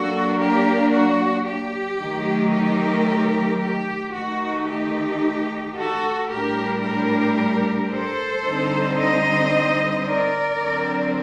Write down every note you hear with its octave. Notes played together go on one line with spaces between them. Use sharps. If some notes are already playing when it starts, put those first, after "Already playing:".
Already playing: F#3 A#3 D4 F#4 A4
G4 A#4
F#4
G4
D#3 F#3 A3 D#4
G4 A#4
G4
D#3 A3 D#4 F#4
G4
F#4 A4
A2 G3 D4 G4 A#4
G4 A#4
A4 C5
D3 G3 C4 D#4
C5 D#5
A#4 D5
D3 F#3 C4